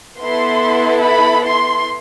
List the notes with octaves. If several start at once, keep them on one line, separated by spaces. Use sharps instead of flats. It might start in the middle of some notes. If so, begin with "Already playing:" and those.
B3 E4 A4 C6
B5
C6